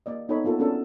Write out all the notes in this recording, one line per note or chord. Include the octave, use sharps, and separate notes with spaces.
A#3 D5 D#5
B3 D#4 A4 C#5 D#5 B5
A#3 B3 F4 A4 A#4
B3 C#4 D4 F#4 A4 A#4